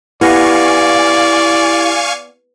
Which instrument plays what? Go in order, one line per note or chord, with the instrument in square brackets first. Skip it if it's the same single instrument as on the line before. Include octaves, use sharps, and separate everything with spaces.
[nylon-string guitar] B3 [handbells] E4 G4 A#6 [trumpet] D5 [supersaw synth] F5 G#5 C#6